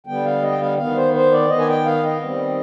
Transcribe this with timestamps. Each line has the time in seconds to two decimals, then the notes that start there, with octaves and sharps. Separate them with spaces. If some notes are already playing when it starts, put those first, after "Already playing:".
0.06 D3 G3 B3 G5
0.25 F5
0.42 D#5
0.52 G5
0.61 F5
0.78 D#3 B3 F5
0.96 C5
1.14 C5
1.32 D5
1.50 D#3 B3 D#5
1.60 G#5
1.68 G5
1.85 F5
2.04 D#5
2.22 D#3 G3 C4